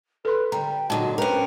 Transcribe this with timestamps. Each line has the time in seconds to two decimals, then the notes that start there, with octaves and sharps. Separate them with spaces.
0.25 A4 B4 C6
0.52 D3 G3 G5 A#5
0.90 A#2 D3 F#3 F#4 D#5 A5
1.18 C4 C#4 G4 A#4 B4 G5